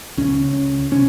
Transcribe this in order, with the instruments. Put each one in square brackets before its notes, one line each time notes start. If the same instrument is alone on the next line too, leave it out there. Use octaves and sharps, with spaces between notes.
[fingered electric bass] C#2 C#3 C#4
C3 C#4